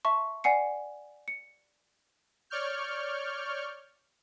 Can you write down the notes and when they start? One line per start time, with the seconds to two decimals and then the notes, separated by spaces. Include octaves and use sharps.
0.05 E5 A5 C6 C#6
0.44 D5 F#5 G#5 C7 C#7
1.28 C#7
2.50 C#5 D5 C#6 F6 G6